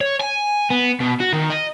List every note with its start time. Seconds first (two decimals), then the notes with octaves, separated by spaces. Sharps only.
0.01 C#5
0.21 G#5
0.70 B3
1.01 B2
1.20 F#4
1.33 D#3
1.50 D#5